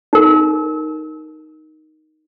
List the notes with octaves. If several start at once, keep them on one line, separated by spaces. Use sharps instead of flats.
D#4 A#4